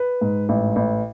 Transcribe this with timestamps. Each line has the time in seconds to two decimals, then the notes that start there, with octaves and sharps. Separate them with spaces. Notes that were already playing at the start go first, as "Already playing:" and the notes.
Already playing: B4
0.21 G#2
0.49 A1
0.76 A1